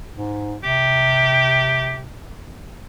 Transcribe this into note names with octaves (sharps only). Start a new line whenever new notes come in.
G#2
C3 G4